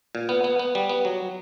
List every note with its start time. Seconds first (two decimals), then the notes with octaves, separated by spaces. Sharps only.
0.15 A#2
0.29 B3
0.44 B3
0.59 B3
0.75 G3
0.89 B3
1.05 F#3